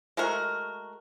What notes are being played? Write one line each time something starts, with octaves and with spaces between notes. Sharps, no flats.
G#3 A3 F#4 A#4